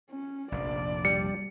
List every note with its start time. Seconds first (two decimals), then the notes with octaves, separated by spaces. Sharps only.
0.10 C#4
0.52 F1 A#1 D4 D5
1.05 G3 C#7